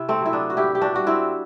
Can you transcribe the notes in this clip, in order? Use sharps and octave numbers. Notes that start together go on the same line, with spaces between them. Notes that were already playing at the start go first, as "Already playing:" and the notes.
Already playing: C3 E4
A3 C4
F#3 E4
B3 D4
F#4
A2 E4 G4
G4
D4 F#4
G3 F#4
C4 E4